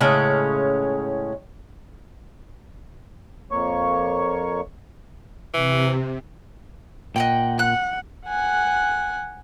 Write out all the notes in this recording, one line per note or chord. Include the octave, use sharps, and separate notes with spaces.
A2 C#3 G#3 C#4
F2 A#3 C#5 C#6
C3 E3
A#2 D#5 F#5 G5
F#5 F#6
F#5 G#5 F#6